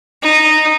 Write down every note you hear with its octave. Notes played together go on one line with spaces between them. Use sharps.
D#4